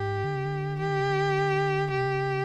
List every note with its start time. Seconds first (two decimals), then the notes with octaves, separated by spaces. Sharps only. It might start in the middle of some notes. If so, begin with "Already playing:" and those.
Already playing: G#2 G4
0.24 D3
0.35 C#3
0.45 D3
0.79 D#3 G4
0.90 D3
1.00 C#3
1.10 D3
1.90 C#3 G4
1.98 C3
2.06 C#3